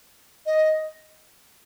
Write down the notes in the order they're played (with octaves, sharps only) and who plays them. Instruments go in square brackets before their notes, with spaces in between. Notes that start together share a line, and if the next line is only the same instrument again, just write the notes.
[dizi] D#5